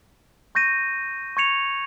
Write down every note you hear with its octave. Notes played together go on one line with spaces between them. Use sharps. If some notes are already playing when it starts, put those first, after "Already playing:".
C#6 G6 A#6 D#7
C#6 G#6 C#7 F7